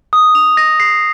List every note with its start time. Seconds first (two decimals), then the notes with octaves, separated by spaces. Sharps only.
0.13 D#6
0.35 F7
0.57 A#6
0.80 C7